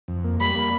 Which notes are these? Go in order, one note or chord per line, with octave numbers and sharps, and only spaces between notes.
F2
A#3
G3 B5
A#3